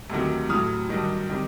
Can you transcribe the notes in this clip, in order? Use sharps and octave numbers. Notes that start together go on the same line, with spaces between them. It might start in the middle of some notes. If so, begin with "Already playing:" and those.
D2 C3 D#3 F#3
A2 F#3 D#6 F6
G2 D#3 F#3
C3 D#3 G3